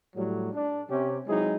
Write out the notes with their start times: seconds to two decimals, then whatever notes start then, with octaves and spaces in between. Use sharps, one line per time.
0.16 A2 F#3 G3
0.53 D4
0.90 C3 C#4 G4
1.27 F#3 G#3 C4 D#4 E4 G#4